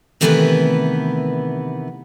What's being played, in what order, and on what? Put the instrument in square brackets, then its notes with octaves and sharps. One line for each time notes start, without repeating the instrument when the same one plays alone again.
[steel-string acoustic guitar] C3 D#3 E3 A3 B3 B4